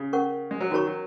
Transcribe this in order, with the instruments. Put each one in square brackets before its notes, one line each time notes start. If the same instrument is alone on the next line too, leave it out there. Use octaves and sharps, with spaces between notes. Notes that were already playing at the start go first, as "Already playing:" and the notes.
Already playing: [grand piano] C#3
[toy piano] C#4 A#4 F#5 C#6
[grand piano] G#3
F#3
[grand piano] D#3 [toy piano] F#4 A#4 C#5 A#5 C#6
[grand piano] F#3